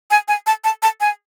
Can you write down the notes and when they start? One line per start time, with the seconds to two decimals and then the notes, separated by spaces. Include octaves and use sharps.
0.11 G#5
0.28 G#5
0.47 A5
0.64 A5
0.83 A5
1.01 G#5